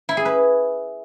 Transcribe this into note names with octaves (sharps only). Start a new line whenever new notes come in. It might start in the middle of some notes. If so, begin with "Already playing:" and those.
E4
G#4
B4